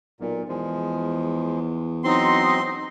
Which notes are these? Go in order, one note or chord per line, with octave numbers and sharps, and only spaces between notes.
B1 A#2
E2 F3 G#3
F#3 C4 D#4 C6